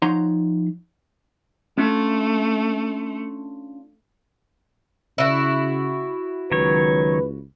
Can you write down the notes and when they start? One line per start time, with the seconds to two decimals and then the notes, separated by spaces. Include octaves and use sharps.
0.02 F3 D#4 C#5 F#5 A#5 C6
1.78 A3 C#4 D4 F4
5.18 C#3 E4 F#4
6.51 C#2 D#3 F#3 B4 C#5